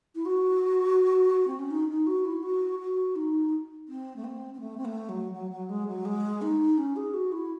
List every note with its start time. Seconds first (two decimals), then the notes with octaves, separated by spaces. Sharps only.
0.15 E4
0.25 F#4
1.47 C4
1.59 C#4
1.70 D#4
1.88 D#4
2.06 F#4
2.24 E4
2.42 F#4
2.79 F#4
3.15 D#4
3.88 C4
4.16 A3
4.23 C4
4.54 C4
4.60 A3
4.77 C4
4.84 A3
5.08 F#3
5.33 F#3
5.51 F#3
5.69 G#3
5.87 F#3
6.05 G#3
6.41 D#4
6.77 C#4
6.96 G#4
7.13 F#4
7.31 E4